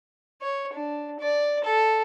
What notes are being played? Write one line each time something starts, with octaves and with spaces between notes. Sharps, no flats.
C#5
D4
D5
A4